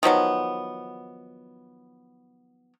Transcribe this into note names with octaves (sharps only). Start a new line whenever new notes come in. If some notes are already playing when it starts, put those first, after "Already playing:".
D#3 F3 F#3 B3